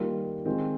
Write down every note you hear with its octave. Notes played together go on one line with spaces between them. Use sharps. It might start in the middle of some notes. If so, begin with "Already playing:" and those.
Already playing: D#3 G3 A#3 F4 A#4
D#3 G#3 C4 F4